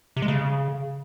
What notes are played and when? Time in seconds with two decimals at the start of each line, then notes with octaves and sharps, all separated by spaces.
0.16 C3
0.22 G#3
0.28 C#3